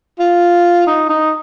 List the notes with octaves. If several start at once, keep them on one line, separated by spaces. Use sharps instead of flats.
F4
D#4
D#4